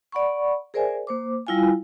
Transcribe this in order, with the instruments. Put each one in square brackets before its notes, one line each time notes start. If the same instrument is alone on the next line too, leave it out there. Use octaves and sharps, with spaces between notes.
[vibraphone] D5 F#5 B5 C#6
G#4 A#4 C5 D5 E5 G#5
A#3 C5 D6
G3 E4 F4 F5 G#5